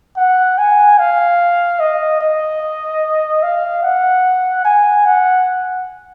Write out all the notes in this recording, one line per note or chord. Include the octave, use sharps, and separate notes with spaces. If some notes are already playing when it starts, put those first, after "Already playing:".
F#5
G#5
F5
D#5
D#5
F5
F#5
G#5
F#5